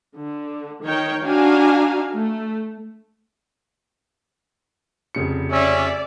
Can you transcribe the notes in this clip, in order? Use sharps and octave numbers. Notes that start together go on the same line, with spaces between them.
D3
D#3 C#5 G5
D4 D#4 F#4 F5 G#5 A#5
A3
F1 C#3 C#7
C#4 D5 E5